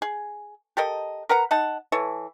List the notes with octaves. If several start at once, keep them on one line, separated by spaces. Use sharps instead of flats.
G#4
G4 A4 A#4 D#5
A#4 B4 F#5 A#5
D#4 F#5 A5
E3 A4 C#5